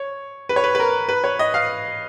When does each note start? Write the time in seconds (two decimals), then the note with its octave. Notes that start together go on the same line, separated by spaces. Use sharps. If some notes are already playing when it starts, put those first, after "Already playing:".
Already playing: C#5
0.49 B4
0.56 C#5
0.64 B4
0.75 B4
0.80 A#4
1.09 B4
1.24 C#5
1.39 D#5
1.54 F5